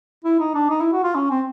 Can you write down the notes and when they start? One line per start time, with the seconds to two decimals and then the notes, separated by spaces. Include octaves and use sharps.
0.25 E4
0.40 D#4
0.55 D4
0.70 D#4
0.81 E4
0.93 F#4
1.04 F4
1.15 C#4
1.30 C4